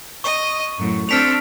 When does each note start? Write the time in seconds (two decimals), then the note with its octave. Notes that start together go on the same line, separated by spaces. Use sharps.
0.24 D#5 C#6
0.78 F#2 A2
1.09 C4 D4 A4 F6 B6 F7